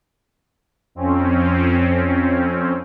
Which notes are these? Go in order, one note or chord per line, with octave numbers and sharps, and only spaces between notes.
F2 C4 C#4